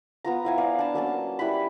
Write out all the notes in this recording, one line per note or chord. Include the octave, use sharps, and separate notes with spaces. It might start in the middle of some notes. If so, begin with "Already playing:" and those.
B3 F4 A#5
E4 F5 G#5
D5 F5
D4 A5
F#3 A#3 C#4 A5
G3 E4 B4 B5